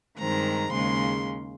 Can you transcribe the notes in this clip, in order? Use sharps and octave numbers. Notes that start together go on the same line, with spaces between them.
G2 D#3 G#3 C4 A#5
D#2 C#3 G#3 C6